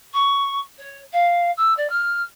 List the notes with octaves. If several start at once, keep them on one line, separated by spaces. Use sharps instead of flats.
C#6
C#5
F5
E6
D5
F6